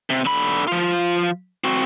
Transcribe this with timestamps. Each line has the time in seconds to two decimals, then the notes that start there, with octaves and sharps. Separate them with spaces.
0.10 C3
0.25 D3 B5
0.68 F3 F4
1.64 C4 F#4